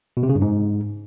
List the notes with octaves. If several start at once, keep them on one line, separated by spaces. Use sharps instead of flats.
B2
C3
C#3
G2
G#2